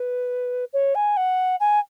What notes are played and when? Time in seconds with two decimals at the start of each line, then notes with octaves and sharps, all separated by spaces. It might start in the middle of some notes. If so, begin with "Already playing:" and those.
Already playing: B4
0.73 C#5
0.95 G#5
1.17 F#5
1.60 G#5